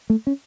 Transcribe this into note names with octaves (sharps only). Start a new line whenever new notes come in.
A3
C#4